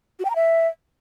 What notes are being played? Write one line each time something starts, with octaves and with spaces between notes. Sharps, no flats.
F#4
G5
A#5
E5